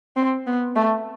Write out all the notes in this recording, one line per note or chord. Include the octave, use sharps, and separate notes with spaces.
C4
B3
A3